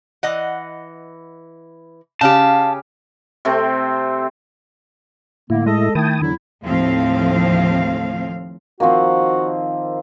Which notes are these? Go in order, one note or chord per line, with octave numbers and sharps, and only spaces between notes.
E3 D#5 F#5
C#3 C#4 G4 F5 A5
C3 A3 C4
A2 D3 A#3 E4
G#3 A4 D#5
D#3 A3 E4 G5 A5 D#6
E2 D3 F#3 E4
D#2 A2 F3 C4 F5
D#3 F3 A#3 C4 F#4